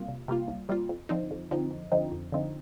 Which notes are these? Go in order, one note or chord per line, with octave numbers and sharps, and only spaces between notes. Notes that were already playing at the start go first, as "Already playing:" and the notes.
Already playing: C3 G3 A#3 F4
C2
C3 G3 A#3 F4
C2
C3 G3 A#3 F4
F2
D3 F3 C4 D#4
F2
D3 F3 C4 D#4
F2
D3 F3 C4 D#4
F2
D3 F3 C4 D#4